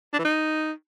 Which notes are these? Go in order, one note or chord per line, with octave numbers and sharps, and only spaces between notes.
D4
E3
D#4